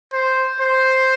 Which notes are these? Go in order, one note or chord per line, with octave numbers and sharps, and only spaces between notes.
C5
C5